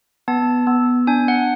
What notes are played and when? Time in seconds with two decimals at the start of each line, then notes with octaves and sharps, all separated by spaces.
0.28 B3 A5
0.67 B3
1.07 D4 G#5
1.28 F#5